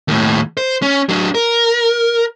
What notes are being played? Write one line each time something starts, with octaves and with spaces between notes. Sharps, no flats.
D#2 A2
C5
C#4
F#3 D4
A#4